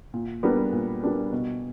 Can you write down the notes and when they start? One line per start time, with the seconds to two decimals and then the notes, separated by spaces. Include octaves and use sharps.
0.14 A#2
0.43 G3 B3 D4 A#4
0.73 A#2
1.03 G3 B3 D4 A#4
1.33 B2